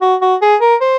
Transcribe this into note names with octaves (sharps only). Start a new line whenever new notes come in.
F#4
F#4
G#4
A#4
C5